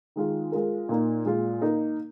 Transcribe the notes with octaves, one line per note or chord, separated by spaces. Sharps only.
D#3 G#3 F4
G#3 F4 A#4
A#2 A#3 D#4
A#2 G#3 F4
A#3 D#4 A#4